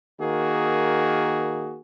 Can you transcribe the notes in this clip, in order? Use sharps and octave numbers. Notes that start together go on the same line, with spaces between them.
D#3 A#3 F#4 G#4